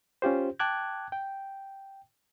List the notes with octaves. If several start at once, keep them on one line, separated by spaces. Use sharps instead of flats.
C#4 F4 G4 C5
G5 A5 D6 F#6 G#6
G5